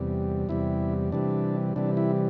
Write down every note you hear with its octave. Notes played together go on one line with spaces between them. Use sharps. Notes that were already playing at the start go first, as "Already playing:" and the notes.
Already playing: E2 C3 G3
E2 C3 G3 E4
C3 E3 G3 D4
C3 E3 G3 D4
E4